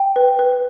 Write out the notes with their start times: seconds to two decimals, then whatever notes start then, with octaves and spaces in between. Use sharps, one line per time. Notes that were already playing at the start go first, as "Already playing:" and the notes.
Already playing: G5
0.16 B4
0.39 B4